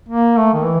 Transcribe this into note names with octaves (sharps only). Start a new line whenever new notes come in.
A#3
A3
D#3
E3